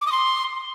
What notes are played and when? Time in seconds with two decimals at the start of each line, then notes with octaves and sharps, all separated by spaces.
0.01 D6
0.07 D#6
0.12 C6